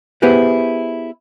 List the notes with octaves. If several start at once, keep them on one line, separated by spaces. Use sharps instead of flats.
B3 E4 G4 G#4 B4 C5